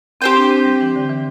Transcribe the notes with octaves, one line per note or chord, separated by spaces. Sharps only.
C4 G4 C5 G5
D4
C4
G3
E3
D3
E3